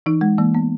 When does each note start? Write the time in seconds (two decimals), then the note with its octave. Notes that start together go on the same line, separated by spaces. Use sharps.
0.06 E3 D#4
0.21 G#3
0.38 E3 A#3
0.55 B3